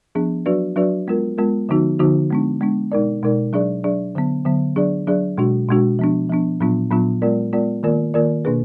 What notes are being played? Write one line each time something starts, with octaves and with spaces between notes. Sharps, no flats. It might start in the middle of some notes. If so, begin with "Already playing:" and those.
F3 B3 D4 G#4
F#3 D4 F#4 B4 D5
F#3 D4 F#4 B4 D5
G#3 B3 F4 A#4
G#3 B3 F4 A#4
D3 F3 B3 D#4 F#4
D3 F3 B3 D#4 F#4
G#3 B3 D4
G#3 B3 D4
B2 G#3 D#4 A#4 D5
B2 G#3 D#4 A#4 D5
F#3 D4 G#4 D5
F#3 D4 G#4 D5
D3 F#3 B3
D3 F#3 B3
F#3 D4 G#4 D5
F#3 D4 G#4 D5
B2 G#3 D4 F#4
B2 G#3 D4 F#4
F3 B3 D4
F3 B3 D4
A#2 F#3 B3 D4 F4
A#2 F#3 B3 D4 F4
G#3 B3 F4 A#4 D5
G#3 B3 F4 A#4 D5
D#3 A#3 F4 A#4 D5
D#3 A#3 F4 A#4 D5
B2 A#3 D4 G#4 B4